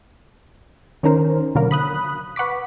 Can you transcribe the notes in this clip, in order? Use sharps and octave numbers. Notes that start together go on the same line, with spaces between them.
D#3 C#4 D#4 A#4 C5
B2 D3 F#3 A#3 A#4
B5 D#6 F#6
B4 F#5 C#6 D6 B6